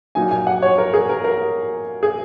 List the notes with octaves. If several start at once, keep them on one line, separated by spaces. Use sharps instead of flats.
A#2 F#3 D#4 G#5
G#5
F#5
C#5
A#4
G#4
A#4
A#4
G#4